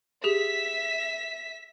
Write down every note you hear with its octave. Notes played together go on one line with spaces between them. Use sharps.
G4 G#4 E5 B6 E7